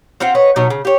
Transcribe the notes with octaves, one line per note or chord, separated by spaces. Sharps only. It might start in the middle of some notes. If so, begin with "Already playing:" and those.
C4 F4 C5 F#5
B4 C#5 D#5
B2 F#3 D#4 C#5
C#3
G4 C#5